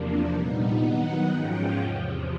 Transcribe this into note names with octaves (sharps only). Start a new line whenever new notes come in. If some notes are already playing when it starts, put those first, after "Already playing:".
Already playing: E2 C3 F3 A#3 D4
A#2 G3 B3 D#4
D#3 F#3 B3 D#4 F#5
G#2 F3 G#3 C#4 F4 G5
E2 C3 F3